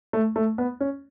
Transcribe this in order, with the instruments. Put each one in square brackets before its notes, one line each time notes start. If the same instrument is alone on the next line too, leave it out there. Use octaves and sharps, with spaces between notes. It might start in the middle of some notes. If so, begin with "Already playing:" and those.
[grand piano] A3
A3
B3
C#4